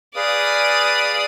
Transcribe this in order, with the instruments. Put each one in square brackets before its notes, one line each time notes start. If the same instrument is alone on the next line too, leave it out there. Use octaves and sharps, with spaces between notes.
[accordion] G#4 B4 F5 [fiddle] D5 D#6